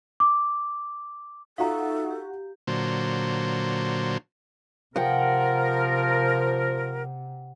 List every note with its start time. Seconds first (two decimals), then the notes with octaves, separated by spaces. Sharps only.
0.20 D6
1.58 D#4 F4 F#4 A4 E5 F5 A#5
2.10 G4
2.67 A#2 D3 F#3 C5
4.96 C3 F3 A#4 F#5 G5